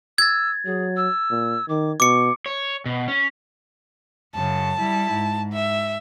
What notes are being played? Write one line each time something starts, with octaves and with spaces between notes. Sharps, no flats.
E6 G#6 A6
F#3 G#4
E6
A#2
D#3 D6
B2 C#6 D6 C#7
C#5
B2
C#4
F#2 C#3 A5
G3 E4
G#2
E5